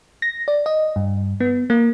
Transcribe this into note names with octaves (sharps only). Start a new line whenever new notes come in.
A#6
D5
D#5
G2
B3
A#3